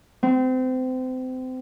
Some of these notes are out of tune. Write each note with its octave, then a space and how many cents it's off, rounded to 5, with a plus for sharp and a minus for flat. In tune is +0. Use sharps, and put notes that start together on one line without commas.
C4 -30